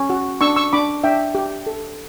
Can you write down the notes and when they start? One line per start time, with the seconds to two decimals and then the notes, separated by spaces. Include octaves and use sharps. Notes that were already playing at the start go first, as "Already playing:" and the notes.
Already playing: C#4
0.10 F#4
0.41 D4 C#6 E6
0.56 C#6 E6
0.73 D4 B5 D6
1.04 D4 E5 G5
1.35 G4
1.67 A4